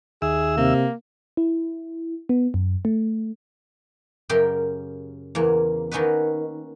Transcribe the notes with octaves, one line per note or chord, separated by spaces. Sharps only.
D#2 G#4 E5 E6
C3 A#3
E4
B3
F#2
A3
F#2 C#3 G4 A#4 G5 C6
E2 C#3 A#3
D#3 A#3 C#4 D#4 F#4 B4